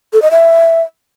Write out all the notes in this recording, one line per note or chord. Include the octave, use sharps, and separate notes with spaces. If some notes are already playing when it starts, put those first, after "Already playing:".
A4
D#5
E5